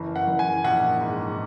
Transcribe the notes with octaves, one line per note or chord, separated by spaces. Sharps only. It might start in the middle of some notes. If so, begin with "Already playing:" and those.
Already playing: F#1 E3
F#5
F#1
G#5
A#1 F#5
G#2